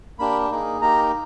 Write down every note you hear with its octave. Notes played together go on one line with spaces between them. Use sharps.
A#3 D4 G4 B5
A#3 D#4 G#4
A#3 D#4 G4 A#5